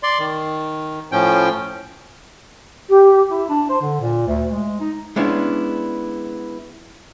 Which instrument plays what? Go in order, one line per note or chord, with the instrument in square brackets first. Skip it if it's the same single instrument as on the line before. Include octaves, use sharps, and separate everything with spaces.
[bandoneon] D5 C6
D#3
A2 F3 C#4 G5
[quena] G4
[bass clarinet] E4
D4
C5
D3
A#2
D2
G#3
D#4
[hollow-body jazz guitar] G#3 B3 C#4 D4 E4